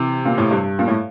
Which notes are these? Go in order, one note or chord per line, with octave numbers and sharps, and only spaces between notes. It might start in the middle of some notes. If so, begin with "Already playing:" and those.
Already playing: C3 E3
A#2
A2
G2
A#2
A2